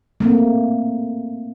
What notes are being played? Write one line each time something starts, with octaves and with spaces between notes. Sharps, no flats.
A3 A#3 C4